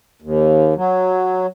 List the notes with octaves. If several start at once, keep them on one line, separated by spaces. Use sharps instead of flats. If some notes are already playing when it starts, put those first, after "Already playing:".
D#2
F#3